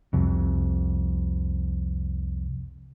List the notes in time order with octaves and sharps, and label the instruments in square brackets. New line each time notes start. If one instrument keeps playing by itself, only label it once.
[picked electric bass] C2 F2